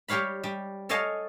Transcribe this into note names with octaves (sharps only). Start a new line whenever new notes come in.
G3 G4 C#5 F5 B5
G3
A4 C#5 D#5 F5 G#5 A5